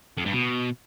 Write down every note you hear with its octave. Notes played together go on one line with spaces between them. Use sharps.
F2
G2
B2